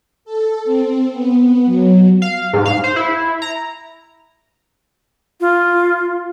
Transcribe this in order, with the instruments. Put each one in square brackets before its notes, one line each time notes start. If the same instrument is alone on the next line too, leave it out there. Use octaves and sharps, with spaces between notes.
[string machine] A4
C4
B3
F#3
[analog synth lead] F5
G#2
F5
C5
E4
A#5
[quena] F4